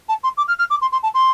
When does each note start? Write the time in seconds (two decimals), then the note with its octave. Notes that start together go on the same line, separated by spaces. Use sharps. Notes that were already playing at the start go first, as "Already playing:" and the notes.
0.09 A5
0.23 C6
0.37 D6
0.48 F6
0.58 F6
0.70 D6
0.81 C6
0.92 C6
1.03 A5
1.14 C6